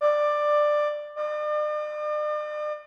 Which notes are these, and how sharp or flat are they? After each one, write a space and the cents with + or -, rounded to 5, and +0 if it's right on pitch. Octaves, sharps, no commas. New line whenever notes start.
D5 +15
D5 +45